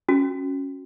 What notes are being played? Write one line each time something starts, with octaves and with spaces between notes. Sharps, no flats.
C#4 F#4